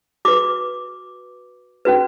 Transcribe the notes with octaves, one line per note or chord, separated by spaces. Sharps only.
F#4 B4 D6
C#4 F#4 B4